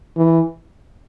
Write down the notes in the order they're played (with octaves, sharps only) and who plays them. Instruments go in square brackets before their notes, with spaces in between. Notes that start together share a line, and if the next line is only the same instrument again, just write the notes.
[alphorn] E3